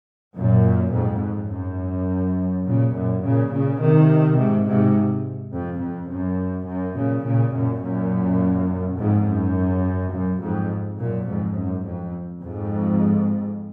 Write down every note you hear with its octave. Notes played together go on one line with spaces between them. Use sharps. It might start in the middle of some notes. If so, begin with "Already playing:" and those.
F#2 A#2
F2 G#2
F2
F#2
A#2 C#3
F#2 A#2
A#2 C#3
A#2 C#3
C3 D#3
G#2 C3
G#2 C3
F2
F2
F#2
F#2
A#2 C#3
A#2 C#3
F#2 A#2
F#2 A#2
F2 G#2
F#2
F#2
F2 G#2
F#2 A#2
F2 G#2
F#2
F2
F2 G#2